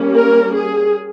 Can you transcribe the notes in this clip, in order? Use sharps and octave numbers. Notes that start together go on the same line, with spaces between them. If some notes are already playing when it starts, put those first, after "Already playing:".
Already playing: G3 A#3 C#4
A#4
G#4